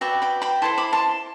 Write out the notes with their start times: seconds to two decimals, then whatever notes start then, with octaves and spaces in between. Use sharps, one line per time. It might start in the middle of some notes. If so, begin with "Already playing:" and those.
0.01 F#4 B4 D5 E5 G5
0.22 G5 B5
0.42 G5 B5
0.62 E4 A4 C5 A5 C6
0.78 B5 D6
0.93 A5 C6